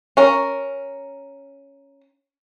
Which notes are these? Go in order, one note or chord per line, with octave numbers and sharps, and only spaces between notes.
C#4 A#4